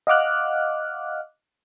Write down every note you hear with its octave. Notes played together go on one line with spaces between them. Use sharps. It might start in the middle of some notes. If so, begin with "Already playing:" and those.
D#5 F5 F#5 D6 F6 F#6